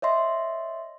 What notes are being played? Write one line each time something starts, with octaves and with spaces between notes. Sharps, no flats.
C#5 D#5 E5 C6